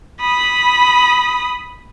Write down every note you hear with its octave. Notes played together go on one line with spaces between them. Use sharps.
B5 D#6